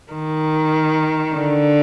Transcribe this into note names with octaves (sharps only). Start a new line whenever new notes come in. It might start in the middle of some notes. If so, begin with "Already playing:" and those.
D#3
D3